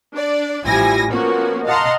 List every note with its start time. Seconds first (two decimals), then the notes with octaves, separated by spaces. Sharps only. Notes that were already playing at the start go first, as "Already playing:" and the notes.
0.14 D4 D5
0.65 A1 F3 G3 E4 G#5 A#6
1.10 F3 A#3 B3 C#4 F#4
1.65 D#5 F5 F#5 A5 A#5 C6